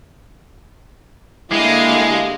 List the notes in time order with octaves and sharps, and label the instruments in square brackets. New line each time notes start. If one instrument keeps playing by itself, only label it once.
[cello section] D3 A#3 [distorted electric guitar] G#3 [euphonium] E4 [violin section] G4 D#5 F5